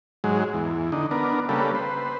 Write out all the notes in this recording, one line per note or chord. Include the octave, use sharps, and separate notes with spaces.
G#2 F#3 G#3
E2
D3 D#4
B3 D4 A#4
C#3 G3 A#3 A4 B4
B4 C5